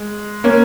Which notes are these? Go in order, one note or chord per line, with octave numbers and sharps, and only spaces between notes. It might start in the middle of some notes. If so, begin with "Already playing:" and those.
Already playing: G#3
A#3 C#4